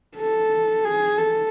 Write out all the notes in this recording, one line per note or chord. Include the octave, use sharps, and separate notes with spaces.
A4
G#4
A4